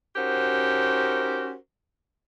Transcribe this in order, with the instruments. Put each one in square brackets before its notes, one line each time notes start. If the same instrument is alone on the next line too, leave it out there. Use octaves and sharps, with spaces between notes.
[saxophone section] C#4 D#4 F#4 G4 A#4 C5